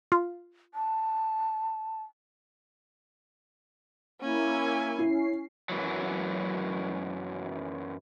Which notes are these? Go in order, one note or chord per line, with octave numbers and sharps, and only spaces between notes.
F4
A5
A#3 C#4 E4 G#5
C#4 E4 C7
F#2 E3 F#3